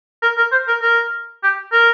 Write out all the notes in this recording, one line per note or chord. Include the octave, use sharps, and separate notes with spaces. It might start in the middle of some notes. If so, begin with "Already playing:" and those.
A#4
A#4
C5
A#4
A#4
G4
A#4